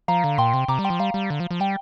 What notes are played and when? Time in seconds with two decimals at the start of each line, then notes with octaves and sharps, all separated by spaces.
0.08 F3 F5 A#5
0.24 D3
0.38 A#2 G5 C6
0.54 C3
0.68 C3 A#5 D6
0.79 G3
0.84 G5 C6
0.90 F3
0.99 G3 F5 A#5
1.14 G3
1.30 D3
1.40 F3
1.51 F3
1.60 G3 G5